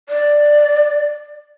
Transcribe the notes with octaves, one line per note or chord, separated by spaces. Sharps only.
D5